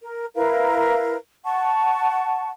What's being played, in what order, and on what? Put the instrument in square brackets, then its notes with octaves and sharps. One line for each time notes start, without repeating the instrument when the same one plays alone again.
[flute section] A#4
E4 A#4 B4 F5
F#5 A5 C#6